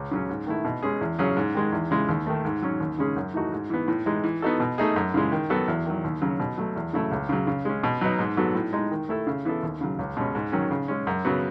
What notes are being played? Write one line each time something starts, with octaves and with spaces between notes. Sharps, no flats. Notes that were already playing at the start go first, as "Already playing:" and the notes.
Already playing: C#2
C#3 F#3 C#4
G#2
D#3 A3 E4
B2
G#3 C#4 G#4
E2
C#3 F#3 C#4 G#4
G#2
D#3 G#3
E2
C#3 E3 G#3
D#2
D#3 A3
G#2
F#3 C#4
D#2
C#3 G#3 C#4 G#4
F#2
E3 A3 D#4 F#4
G#2
E3 B3
A2
E3 G#3 D#4
E3
B3 D#4 F#4 A4
B2
A3 D#4 G#4
F#2
C#3 E3 G#3
D#3
F#3 B3 F#4 A4
E2
D#3 F#3
D#2
C#3 F#3 C#4 F#4
B2
F#3 A3
E2
C#3 F#3 A3 E4
C#2
C#3 F#3
C#3
G#3 C#4
B2
F#3 B3 D#4
G#2
F#3 B3 F#4 A4
A2
G#3 D#4
D#3
A3 E4 A4
C#3
E3 B3 E4 A4
D#2
C#3 F#3
C#2
B2 G#3 C#4
G#2
D#3 F#3 C#4
C#3
G#3 C#4
F#2
C#3 F#3 B3 F#4